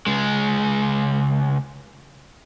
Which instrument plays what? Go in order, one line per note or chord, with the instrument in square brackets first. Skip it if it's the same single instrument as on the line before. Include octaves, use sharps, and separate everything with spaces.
[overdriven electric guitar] C#2 G#3